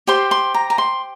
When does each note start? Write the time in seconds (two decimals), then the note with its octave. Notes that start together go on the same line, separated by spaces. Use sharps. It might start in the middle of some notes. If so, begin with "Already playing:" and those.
0.07 G4 C5 C6
0.31 C6
0.54 A#5
0.70 A#5
0.78 C6